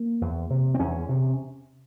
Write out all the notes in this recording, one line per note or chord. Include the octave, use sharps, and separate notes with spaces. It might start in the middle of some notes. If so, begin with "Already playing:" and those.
Already playing: A#3
E2
C3
C4
E2 C#4
C3